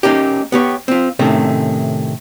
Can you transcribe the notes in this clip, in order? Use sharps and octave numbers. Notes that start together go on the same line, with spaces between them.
A#3 C#4 D#4 G4
B3 G4 C#5
C4 F4
A2 C3 D#3 A3 C#4